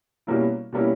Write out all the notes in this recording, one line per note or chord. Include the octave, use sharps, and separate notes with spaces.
B2 G3 A#3 C#4 E4
B2 G3 A#3 C#4 E4